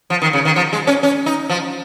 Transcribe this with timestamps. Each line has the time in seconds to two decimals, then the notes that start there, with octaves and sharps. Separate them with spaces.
0.10 F3
0.22 D#3
0.33 C#3
0.45 D#3
0.56 F3
0.73 G#3
0.87 C#4
1.03 C#4
1.26 D#4
1.49 F3